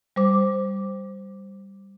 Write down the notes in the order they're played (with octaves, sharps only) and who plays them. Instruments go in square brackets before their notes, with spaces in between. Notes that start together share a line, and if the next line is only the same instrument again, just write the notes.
[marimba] G3 C5 D6